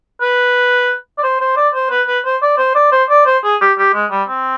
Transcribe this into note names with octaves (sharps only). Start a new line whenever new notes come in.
B4
D5
C5
C5
D5
C5
B4
B4
C5
D5
C5
D5
C5
D5
C5
G#4
G4
G4
G#3
G3
C4